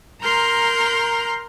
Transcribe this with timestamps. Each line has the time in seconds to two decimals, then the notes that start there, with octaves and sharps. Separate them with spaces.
0.22 A#4 A#5 C6 F6 G6